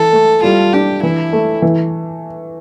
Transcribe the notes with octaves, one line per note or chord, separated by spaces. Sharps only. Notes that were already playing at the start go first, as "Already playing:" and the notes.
Already playing: E3 A4
A3
G3 F4
D4 G4
E3 E4
A3
E3